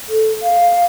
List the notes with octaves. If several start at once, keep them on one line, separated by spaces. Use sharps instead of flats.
A4
F5